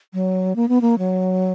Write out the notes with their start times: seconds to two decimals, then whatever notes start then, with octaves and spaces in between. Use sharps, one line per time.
0.13 F#3
0.56 A#3
0.69 B3
0.81 A#3
0.98 F#3